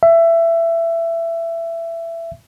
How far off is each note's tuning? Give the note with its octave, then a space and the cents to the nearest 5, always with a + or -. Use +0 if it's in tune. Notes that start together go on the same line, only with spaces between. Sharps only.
E5 +20